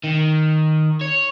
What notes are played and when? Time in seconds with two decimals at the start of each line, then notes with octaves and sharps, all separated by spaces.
0.04 D#3
1.01 C#5